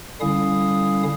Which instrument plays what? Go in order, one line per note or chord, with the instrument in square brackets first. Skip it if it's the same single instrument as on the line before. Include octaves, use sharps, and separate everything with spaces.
[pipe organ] D3 G3 C#4 E4 F5 D#6